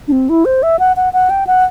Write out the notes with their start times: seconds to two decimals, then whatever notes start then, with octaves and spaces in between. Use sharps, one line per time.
0.08 D4
0.12 C4
0.29 E4
0.45 C5
0.63 E5
0.79 F#5
0.97 F#5
1.13 F#5
1.30 G5
1.47 F#5